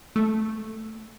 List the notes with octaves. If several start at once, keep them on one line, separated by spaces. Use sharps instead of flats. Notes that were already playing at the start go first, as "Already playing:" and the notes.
A3